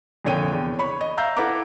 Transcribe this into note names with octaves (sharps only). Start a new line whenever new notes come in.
F2 A#2 D3 C#5 G5 D#7
E2
C#5 B5 C#6
D#5
E5 F5 A#5 E6 G6
E4 A4 B4 F#5 A#5 D6